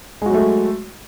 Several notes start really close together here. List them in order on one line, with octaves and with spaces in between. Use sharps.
G#3 F#4 F#3 A3